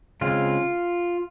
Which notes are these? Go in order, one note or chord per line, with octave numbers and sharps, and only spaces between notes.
C#3 G#3 C4 F4